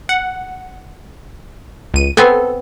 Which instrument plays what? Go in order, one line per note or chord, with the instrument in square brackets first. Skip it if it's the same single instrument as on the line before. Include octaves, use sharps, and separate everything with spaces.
[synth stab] F#5
C#2 D#7
[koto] B3 C4 G#5 [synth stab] A4